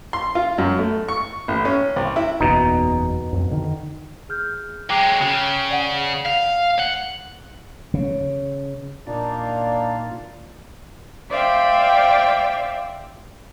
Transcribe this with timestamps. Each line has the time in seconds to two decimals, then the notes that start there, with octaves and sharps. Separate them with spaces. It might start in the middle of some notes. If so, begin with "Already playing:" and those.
0.13 C6
0.35 F4
0.58 F#2
0.79 A3
1.09 C#6
1.48 A1
1.65 C#4
1.96 C2
2.16 E4
2.40 F#1 E2 B2 D#4
3.33 F2
3.51 D3 D#3
4.29 G#4 F6 G6
4.90 F#3 G#3 G5 D6 C7
5.21 C#3
5.70 D5 F#5 G7
6.26 F5
6.80 F#5 G7
7.94 C#3
9.07 A#2 A#3 D4 D#4 F4 D5
11.31 C5 D5 E5 F5 G5